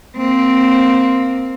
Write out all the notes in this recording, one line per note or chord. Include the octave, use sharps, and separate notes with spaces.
A#3 C4